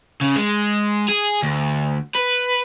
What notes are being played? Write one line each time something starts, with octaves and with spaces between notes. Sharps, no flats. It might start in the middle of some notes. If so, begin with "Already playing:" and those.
C#3
G#3
G#4
D2
B4